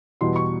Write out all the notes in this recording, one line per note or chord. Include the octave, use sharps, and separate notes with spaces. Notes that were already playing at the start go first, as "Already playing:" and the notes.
E2 B2 G3 C6
C#6